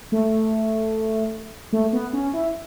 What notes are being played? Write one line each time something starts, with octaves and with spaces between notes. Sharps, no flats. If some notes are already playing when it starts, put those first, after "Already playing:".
A3
A3
B3
C#4
E4